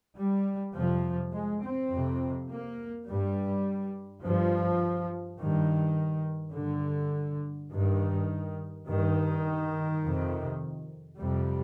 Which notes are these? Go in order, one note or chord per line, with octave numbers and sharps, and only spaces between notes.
G3
F2 C3 F3
G#3
C4
F2 C3
A#3
G2 G3
G2 F3
G2 D#3
G2 D3
G2 D#3
G2 D#3
F2 C3
F2 C3 G3